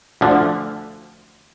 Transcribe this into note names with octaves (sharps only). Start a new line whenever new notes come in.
D2 D3 F3